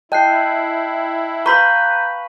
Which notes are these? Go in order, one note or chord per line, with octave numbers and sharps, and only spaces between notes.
E4 D#5 G5 A5 F#6 C7
B4 F5 A#5 C#6 G6 B6 F#7